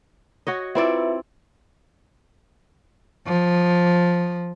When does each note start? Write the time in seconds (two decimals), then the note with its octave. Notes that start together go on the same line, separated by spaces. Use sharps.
0.47 F#4 C#5 D#5
0.75 C4 E4 F4 B4 D5 E5
3.27 F3